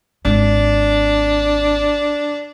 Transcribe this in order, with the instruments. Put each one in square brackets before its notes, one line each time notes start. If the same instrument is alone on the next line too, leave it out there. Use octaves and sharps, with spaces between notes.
[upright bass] G#1 [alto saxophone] D4